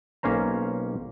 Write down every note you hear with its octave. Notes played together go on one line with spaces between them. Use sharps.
B1 A#3 C#4 C5 A#5